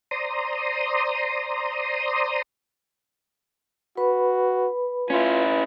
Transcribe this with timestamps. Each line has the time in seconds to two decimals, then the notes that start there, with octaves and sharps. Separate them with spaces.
0.11 C5 D5 A#5 C6 D#6
3.97 F#4 B4 B5
5.10 C#4 E4 F4